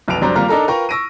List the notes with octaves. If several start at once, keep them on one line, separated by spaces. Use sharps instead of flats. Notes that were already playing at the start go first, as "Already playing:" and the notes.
F1 B1 B4 A5 D7 F7
F1 F#3 G3 D4 C5 A#5
G#1 G3 A#3 F4 A#5 F6
D4 D#4 A4 A#4 A#5
F4 A#4 B4 G5 A#5 C#6
C#6 E6 A#6 D7 D#7